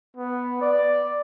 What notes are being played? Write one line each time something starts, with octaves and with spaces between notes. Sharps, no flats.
B3
D5